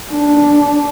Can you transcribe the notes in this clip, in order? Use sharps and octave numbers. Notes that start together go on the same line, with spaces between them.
D4